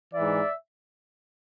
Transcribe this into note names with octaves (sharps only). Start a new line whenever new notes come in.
G#2 E3 D5 E5